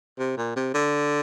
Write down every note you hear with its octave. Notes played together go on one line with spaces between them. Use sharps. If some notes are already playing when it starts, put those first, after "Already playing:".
C3
A#2
C3
D3